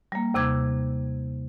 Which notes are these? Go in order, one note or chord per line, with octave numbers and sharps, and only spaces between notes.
G3 A#3
D#2 C3 D6 G#6